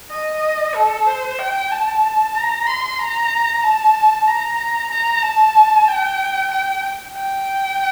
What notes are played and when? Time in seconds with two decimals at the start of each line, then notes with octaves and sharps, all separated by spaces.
0.11 D#5
0.75 A4
1.07 C5
1.39 G5
1.71 A5
2.34 A#5
2.66 C6
2.99 A#5
3.63 A5
4.27 A#5
4.91 A#5
5.23 A5
5.87 G5
6.51 G5
7.15 G5